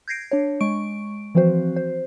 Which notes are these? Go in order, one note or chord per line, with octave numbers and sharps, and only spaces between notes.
G6 G#6 A#6 C7 D7
D4 C#5
G#3 C#6 D7
E3 F3 C4 F#4 C5
C5